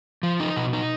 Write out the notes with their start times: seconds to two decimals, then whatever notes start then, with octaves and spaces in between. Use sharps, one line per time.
0.23 F3
0.40 D#4
0.56 B2
0.73 D#4